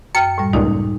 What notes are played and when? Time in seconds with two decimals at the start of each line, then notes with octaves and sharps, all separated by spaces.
0.15 F#2 G5 F6 C#7
0.38 A2 G3
0.53 C#2 A#2 D#4